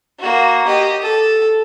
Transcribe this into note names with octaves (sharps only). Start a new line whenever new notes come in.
A#3 F#4
G4 D#5
A4